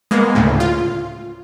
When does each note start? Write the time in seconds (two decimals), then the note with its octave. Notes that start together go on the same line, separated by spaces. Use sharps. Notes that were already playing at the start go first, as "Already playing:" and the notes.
0.11 G#3 A#3 B3
0.35 D2 A2 C#3
0.60 F4